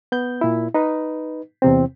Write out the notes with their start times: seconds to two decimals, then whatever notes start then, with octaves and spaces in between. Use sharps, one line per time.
0.12 B3 G6
0.41 A#2 E4
0.74 D#4 B4
1.62 E2 C3 C4